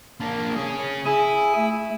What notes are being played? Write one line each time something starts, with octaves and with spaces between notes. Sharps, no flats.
A#3 D4
C#4 G#4
E4 G#4 G#5
A3